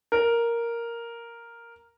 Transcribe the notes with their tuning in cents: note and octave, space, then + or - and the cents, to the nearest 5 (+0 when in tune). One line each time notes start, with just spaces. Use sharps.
A#4 +0